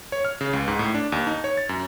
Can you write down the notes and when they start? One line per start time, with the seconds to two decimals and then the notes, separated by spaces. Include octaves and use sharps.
0.12 C#5
0.25 F6
0.41 C#3
0.53 C#2
0.68 G#2
0.79 A2
0.94 D4
1.12 D#2
1.27 D#4
1.44 C#5
1.57 A6
1.69 F#2